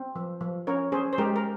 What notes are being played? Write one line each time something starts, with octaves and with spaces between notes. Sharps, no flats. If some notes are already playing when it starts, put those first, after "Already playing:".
Already playing: C4
F3
F3
C#4 A#4 C#5
C#4 G#4 C5
C5
G#3 G4 A#4
A#4